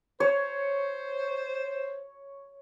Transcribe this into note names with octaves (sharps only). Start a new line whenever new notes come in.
C5 C#5